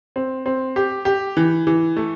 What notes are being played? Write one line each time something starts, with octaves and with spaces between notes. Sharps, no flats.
C4
C4
G4
G4
E3
E3
A3